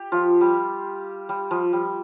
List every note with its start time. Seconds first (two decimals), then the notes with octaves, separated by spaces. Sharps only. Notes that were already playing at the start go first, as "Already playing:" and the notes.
Already playing: G4
0.12 F3 F4
0.41 G3
1.29 G3
1.51 F3
1.73 G3